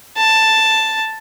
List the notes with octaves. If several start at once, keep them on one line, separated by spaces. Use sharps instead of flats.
A5